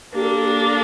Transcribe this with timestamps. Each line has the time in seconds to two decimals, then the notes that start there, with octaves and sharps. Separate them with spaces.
0.14 A#3 D4 G4
0.22 A4
0.30 G4
0.37 A4
0.45 G4
0.52 A4